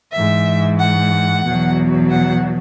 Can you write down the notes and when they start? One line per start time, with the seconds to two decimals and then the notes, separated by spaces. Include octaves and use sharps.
0.12 G#2 E3 E5
0.79 F#5
1.43 E2 B2 F#3
2.10 F#5